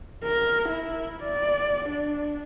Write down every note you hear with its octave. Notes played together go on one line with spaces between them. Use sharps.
A#4
E4
D5
D4